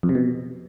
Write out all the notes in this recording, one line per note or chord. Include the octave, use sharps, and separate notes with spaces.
F2
C3
B2